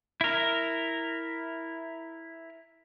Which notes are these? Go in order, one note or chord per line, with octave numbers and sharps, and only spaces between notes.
E4 A#4